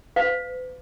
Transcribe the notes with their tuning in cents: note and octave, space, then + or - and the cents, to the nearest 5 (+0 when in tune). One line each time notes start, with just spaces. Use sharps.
B4 +40 F5 +0